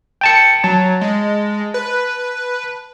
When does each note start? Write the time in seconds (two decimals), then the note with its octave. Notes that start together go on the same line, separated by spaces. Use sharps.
0.21 G5 A5 C#7
0.64 F#3 A5
1.01 G#3
1.74 B4